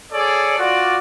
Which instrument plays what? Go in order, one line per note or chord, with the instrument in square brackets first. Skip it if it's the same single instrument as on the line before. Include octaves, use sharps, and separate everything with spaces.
[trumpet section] G#4 A4 C#5 D5
F4 F#4 D5